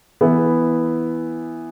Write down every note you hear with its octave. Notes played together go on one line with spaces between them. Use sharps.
E3 B3 E4